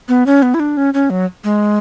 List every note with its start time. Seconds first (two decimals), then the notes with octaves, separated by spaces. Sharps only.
0.08 B3
0.26 C#4
0.42 B3
0.54 E4
0.60 D4
0.77 C#4
0.94 C#4
1.10 F#3
1.44 G#3